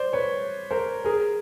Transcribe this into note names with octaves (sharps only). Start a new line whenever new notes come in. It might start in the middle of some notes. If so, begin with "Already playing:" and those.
Already playing: C5 D5
B4 C#5
A#4 C5
G#4 A#4